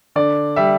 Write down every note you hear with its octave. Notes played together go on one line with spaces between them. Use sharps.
D3 D5
G3 E5